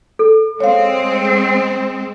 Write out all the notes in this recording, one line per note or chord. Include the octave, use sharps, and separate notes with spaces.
A4
G#3 C4 C#5 F5